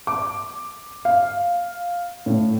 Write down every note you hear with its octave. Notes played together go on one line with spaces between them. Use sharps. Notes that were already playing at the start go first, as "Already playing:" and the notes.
D6
F5
A2